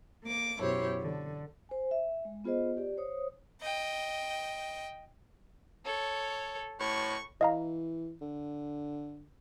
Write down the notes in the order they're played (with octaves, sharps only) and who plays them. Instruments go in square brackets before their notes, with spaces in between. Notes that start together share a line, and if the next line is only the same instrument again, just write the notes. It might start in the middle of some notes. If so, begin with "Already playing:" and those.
[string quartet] A#3 D6
F#2 B2 E4 G4 C5 C#5
D3
[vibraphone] C5 G#5
E5
G#3
B3 F4 G#4 C5 D#5
G4 D5
C5 C#5 D#6
[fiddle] D#5 G5
A4 C#5
[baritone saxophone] A2 [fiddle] C#6
[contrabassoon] E3 [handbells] D#5 F5 A#5
[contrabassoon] D3